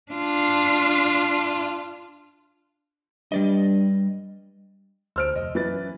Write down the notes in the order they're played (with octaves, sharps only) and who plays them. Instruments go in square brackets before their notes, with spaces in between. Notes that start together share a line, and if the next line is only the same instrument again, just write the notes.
[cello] D4 F4
[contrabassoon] G2 [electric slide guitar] G3 D5 D#5
[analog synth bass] D2 [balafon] C5 C6 [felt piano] E6 F6 D7
[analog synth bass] F1 [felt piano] D#5
[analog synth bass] F#2 [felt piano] E3 B4 A6